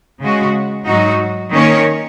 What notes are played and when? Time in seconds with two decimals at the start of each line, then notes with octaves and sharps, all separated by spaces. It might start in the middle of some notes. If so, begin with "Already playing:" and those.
0.20 C#3 G#3 F#4
0.86 G#2 F#3 D#4 F#4
1.53 D#3 A#3 C#4 A#4 C#5